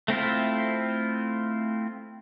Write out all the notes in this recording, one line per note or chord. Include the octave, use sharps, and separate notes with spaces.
A3 C4 E4 F4